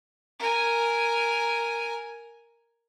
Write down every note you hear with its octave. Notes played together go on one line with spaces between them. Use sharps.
A#4 G#5